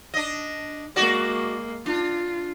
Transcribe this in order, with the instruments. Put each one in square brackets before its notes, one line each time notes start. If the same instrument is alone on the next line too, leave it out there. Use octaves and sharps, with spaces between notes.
[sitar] D4 D#5
[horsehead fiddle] G#3 A#3 [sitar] F#4 D5
[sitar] D4 [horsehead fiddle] F4